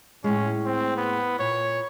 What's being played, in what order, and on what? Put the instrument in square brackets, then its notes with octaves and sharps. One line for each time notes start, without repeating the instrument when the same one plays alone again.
[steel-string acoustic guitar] A2 G#3 [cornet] C#4
[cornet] C4
B3
[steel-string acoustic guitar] A#2 [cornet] C#5